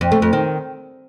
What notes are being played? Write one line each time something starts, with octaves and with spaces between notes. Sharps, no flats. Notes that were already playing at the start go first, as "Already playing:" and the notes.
F2
A3
F2
D#3